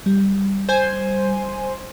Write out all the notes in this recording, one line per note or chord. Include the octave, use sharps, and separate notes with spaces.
G3
C5 G#5